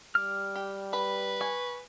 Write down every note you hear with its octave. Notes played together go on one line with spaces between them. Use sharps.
G3 D6 F6
G4
B4 B5
G#5 C#6